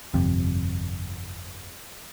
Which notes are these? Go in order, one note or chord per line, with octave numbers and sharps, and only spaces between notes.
G1 F2 C3